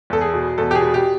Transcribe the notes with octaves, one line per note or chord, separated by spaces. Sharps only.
E2 A4
G#4
B2
E2 A4
G4
G#4
B2
G4